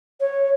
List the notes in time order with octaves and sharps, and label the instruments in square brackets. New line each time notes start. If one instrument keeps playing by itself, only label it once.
[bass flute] C#5